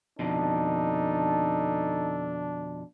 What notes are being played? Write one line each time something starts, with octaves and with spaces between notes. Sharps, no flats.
F2 B2 D3 D4 D#4 A4